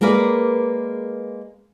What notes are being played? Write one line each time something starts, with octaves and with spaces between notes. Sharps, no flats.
G#3 A#3 G#4 A#4 B4 D5